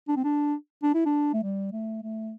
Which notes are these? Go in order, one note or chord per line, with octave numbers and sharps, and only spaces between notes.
D4
C4
D4
D4
E4
D4
A3
G3
A3
A3